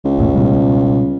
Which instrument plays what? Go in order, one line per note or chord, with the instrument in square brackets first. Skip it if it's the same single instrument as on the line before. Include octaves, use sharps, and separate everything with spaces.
[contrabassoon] C#2
[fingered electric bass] B1 E2 A2
B2 G3